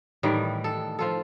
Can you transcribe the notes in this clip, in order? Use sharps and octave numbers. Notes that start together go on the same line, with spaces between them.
A2 D#3 E3 G3
A4
F3 F4 A4